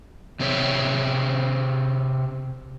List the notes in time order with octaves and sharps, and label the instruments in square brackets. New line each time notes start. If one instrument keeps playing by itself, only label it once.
[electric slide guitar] C3 C4 G#4 C#5 E5